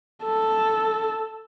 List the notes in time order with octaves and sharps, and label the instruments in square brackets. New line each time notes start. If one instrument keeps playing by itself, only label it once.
[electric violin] A4